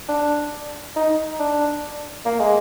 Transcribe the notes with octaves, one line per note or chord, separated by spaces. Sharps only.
D4
D#4
D4
A#3
G#3